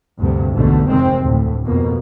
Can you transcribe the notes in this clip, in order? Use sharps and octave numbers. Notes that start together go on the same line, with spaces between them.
D2 G2 C3
B1 E2 G#2 B2 D3 A3
F1 C3 D#3 G#3 C4
D2 A2
F2 B2 A#3